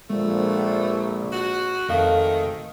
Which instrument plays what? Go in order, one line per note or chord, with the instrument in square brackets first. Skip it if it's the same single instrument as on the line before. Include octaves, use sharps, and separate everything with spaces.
[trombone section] A#1 [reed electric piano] G#3 [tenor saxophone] A3
[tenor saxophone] F#4
[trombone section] G#1 A3 [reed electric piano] F2 F5 [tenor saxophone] D#3